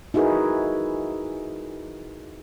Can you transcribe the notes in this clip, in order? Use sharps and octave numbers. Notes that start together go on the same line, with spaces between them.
D#4 E4 F#4 G#4 A#4 B4